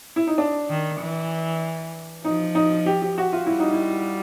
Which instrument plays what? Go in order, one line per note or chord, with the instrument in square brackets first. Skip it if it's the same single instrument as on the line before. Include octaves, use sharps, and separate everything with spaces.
[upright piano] E4
D#4
D4
[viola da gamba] D#3
E3
[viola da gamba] F3 [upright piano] D#4
[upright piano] D#4
G4
G4
F#4
F4
[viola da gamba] G3 [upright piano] E4
[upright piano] D#4
E4